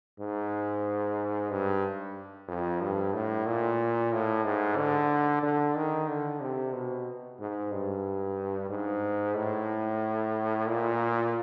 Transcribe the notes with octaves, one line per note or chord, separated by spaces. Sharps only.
G#2
G2
F2
G2
A2
A#2
A2
G#2
D3
D3
D#3
D3
C3
B2
G#2
G2
G#2
A2
A#2